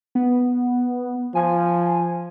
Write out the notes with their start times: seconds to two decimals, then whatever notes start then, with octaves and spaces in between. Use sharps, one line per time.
0.15 B3
1.35 F3 G#5